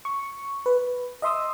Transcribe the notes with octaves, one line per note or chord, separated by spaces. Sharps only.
C#6
B4
D#5 E5 C6 D#6 E6